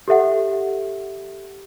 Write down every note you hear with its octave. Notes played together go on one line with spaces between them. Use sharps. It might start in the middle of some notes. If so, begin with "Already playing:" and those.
G4 A4 E5 F#5